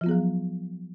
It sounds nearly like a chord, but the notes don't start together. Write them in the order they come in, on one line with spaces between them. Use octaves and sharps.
F3 F4 B3 G#4 F#3